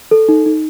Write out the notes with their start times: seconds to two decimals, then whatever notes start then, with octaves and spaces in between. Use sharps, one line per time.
0.11 A4
0.29 D#4
0.46 D#4